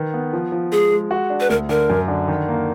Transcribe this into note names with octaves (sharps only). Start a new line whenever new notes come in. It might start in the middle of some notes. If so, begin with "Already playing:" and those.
Already playing: D#3 B4
B3
F3
F3
G#3 G#4
G#3
F#4
D4
B4
D2 A#4
D3 A#4
F#2
D3
D#3
A#3